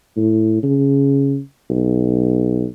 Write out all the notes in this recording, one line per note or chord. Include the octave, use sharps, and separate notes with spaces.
A2
C#3
B1